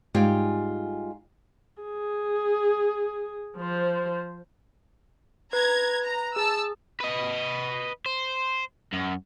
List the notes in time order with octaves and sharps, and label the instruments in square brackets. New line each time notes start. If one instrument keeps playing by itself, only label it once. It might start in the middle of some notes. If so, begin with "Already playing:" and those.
[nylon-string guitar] G#2 G3 F4 G4 G5 G#5
[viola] G#4
F3 C5
[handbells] B4 [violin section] A#5 G#6
[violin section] A#5
[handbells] G#4 [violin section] A5 E6
[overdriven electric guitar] B4 D#5
C5
F#2